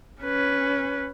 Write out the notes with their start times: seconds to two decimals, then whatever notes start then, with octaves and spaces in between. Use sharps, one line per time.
0.22 C#4 B4